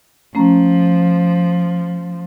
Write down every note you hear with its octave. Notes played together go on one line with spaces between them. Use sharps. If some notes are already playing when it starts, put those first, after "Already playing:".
F3 A3 C#4 A#5